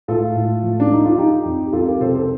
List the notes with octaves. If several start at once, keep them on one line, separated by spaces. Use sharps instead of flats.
A2 F4 A4
A2
F3
D4
F3 D#4
F4
F3 D#4 G4
F2
G4
F2 F4 A4
G4 A#4
C3 A4 C5
A4 C5